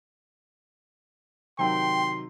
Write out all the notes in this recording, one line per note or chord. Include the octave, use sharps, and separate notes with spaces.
C3 D#3 F#3 G5 C6